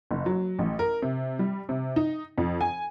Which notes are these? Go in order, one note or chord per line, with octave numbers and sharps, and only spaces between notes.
F#1
F#3
A1
A#4
C3
G3
C3
D#4
F2
G#5